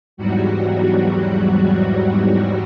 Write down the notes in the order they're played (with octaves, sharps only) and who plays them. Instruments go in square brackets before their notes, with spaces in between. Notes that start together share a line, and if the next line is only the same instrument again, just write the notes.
[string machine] E2 G#2 F#3 G3 F#4